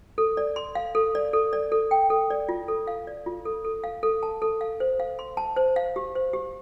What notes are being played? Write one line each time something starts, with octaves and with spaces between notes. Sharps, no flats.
A4
D5
C6
F5
A4
D5
A4
D5
A4
G5
A4
D5
F4
A4
F5
D5
F4
A4
A4
F5
A4
A5
A4
F5
C5
F5
C6
A5
C5
F5
G4
C5
G4